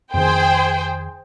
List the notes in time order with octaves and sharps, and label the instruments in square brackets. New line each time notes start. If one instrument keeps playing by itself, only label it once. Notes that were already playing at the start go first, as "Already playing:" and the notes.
[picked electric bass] F2 D#3 [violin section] G#4 C5 G5